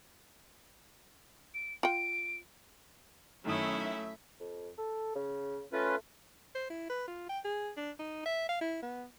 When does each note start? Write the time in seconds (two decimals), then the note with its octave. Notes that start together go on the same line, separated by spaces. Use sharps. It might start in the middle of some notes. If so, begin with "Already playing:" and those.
1.54 D7
1.83 F4 G5 D7
3.45 F#2 D#3 F#3 A3 C#4 E4 E5 D#6
4.40 F2
4.78 A4
5.15 C#3
5.73 A3 C#4 F4 B4
6.55 C5
6.70 E4
6.90 B4
7.07 F4
7.29 G5
7.44 G#4
7.77 D4
7.99 D#4
8.26 E5
8.49 F5
8.61 E4
8.82 B3